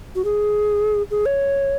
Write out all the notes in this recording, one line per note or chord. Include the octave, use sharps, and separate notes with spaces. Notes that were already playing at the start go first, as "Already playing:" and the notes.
F#4
G#4
G#4
C#5